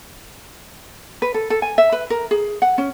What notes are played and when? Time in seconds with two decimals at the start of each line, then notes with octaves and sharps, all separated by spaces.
1.22 B4
1.34 A4
1.50 A4
1.62 G#5
1.78 E5
1.92 B4
2.10 A#4
2.31 G#4
2.62 F#5
2.78 C#4